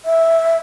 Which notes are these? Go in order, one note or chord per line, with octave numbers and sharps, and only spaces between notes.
E5